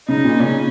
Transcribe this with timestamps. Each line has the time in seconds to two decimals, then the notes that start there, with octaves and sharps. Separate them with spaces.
0.08 C#3 D#4
0.24 A#2
0.40 C#3 C#4